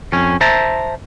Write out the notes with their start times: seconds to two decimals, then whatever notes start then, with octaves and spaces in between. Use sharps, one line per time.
0.13 F2 C#4
0.41 C5 E5 A5 A#5